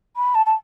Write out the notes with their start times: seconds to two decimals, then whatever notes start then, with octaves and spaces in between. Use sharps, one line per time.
0.16 B5
0.35 A5
0.46 A5